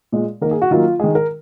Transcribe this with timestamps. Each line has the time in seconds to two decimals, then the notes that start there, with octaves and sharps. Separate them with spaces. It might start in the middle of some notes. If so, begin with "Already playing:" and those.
0.12 A#2 G#3
0.41 D#3 A#4
0.45 A#3
0.51 G#4
0.62 F#4
0.71 D#3 F#3 A#3 F4
1.00 D#3 G#3 G#4
1.15 A#4